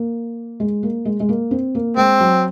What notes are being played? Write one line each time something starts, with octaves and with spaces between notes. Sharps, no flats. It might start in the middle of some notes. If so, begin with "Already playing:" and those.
Already playing: A#3
G#3
A#3
G#3
G#3
A#3
C4
A#3
G#3 C4
F#3